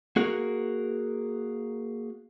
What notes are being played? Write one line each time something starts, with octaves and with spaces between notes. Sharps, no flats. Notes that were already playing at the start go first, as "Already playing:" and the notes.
A#3 F#4 G#4 A#4